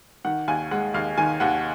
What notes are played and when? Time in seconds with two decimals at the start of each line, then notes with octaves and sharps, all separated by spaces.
0.25 D#3 F#5
0.48 D#2 G#5
0.71 G#3 F#5
0.94 D#2 F5
1.18 D#3 G#5
1.40 D#2 F#5